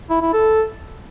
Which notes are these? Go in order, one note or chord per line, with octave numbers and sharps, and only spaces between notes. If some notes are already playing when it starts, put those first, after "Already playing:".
E4
E4
A4